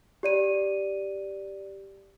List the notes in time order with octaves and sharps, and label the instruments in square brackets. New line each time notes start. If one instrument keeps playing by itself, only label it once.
[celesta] G4 D5 D#7